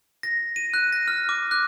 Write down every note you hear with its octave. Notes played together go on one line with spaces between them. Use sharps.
A#6
D#7
F#6
A#6
F6
D6
F#6